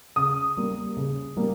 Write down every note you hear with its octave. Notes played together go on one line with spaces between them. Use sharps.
C#3 D#6
G3 A#3
C#3
G3 A#3